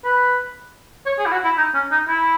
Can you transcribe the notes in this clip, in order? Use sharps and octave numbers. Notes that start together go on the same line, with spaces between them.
B4
C#5
G#4
E4
F#4
E4
D#4
C#4
D#4
E4